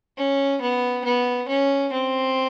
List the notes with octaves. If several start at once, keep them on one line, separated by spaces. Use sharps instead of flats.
C#4
B3
B3
C#4
C4